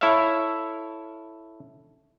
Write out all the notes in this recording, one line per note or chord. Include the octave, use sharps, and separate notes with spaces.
E4 A4 C#5 E5 F5